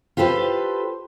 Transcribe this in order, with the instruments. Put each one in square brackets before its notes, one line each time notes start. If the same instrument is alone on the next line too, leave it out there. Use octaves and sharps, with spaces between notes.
[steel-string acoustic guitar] F4 G4 A4 B4 C5